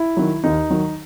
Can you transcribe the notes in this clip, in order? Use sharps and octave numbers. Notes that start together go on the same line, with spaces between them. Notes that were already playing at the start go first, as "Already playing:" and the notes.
Already playing: E4
D#3 F#3
D#2 D#4
D#3 F#3